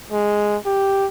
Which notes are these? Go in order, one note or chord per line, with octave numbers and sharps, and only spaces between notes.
G#3
G4